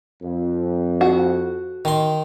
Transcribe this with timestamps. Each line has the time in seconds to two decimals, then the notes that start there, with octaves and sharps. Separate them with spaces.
0.22 F2
1.01 F#4
1.85 D#3 C6